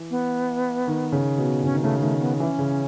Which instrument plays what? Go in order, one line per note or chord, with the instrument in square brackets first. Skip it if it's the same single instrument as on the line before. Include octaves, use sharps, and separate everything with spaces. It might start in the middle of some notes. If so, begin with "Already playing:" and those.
Already playing: [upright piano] E3
[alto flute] B3
[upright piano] D#3
C#3
B2
[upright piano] C#3 [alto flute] C#4
[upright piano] D#3
[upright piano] C#3 [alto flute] A3
[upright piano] D#3 [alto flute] A3
[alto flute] B3
[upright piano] E3 [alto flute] C#4
[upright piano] C#3